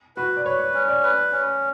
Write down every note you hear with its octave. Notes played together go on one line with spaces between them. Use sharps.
F#4 B4
D5
B4 C#5
C#5
C#4
D5
B4
C#4